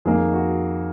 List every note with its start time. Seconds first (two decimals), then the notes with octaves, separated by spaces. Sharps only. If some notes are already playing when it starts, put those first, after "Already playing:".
0.05 F2 D#3 A#3 G#4
0.33 F#4